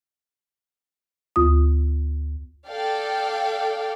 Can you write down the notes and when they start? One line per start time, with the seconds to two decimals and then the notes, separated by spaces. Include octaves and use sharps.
1.36 D2 F4 D#6
2.68 A4 D5 F5 G5